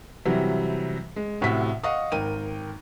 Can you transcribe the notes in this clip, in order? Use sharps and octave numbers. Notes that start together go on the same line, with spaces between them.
C3 E3 F#3 G3
G#3
A1 A2 C3 F#4 B6
D#5 F5 F#5 C#6 D#6
G#1 A#4 G5 D#7